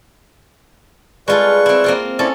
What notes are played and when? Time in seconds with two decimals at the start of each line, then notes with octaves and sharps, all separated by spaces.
1.28 G3 G#3 F4 A4 B4 C#6
1.66 C4 E4
1.84 A#3 C4 F4
2.19 C4 C#4 E4 A4 D5